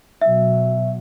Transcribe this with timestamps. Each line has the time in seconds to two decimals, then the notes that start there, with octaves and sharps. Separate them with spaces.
0.21 B2 F#3 E5